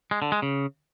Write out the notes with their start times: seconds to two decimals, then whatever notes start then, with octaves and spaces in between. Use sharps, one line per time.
0.11 G#3
0.22 D3
0.32 G#3
0.42 C#3